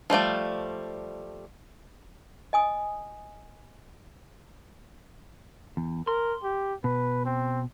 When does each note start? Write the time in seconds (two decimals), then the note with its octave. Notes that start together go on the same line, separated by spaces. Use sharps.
0.10 F3 G3 A3 D5
2.53 D#5 G#5 D#6
5.77 E2
6.07 A#4 C6
6.44 G4
6.84 B2 B4
7.25 C4